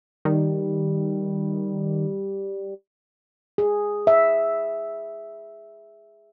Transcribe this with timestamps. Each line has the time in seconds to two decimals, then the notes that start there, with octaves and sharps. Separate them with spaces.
0.25 D#3 G3
3.58 G#4
4.07 E5